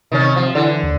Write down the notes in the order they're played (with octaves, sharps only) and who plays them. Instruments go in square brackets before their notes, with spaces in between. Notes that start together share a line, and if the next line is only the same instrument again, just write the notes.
[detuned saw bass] C3 [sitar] D#3 C#4
[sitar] F3
[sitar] D3 [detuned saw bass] E3
[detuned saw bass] D#2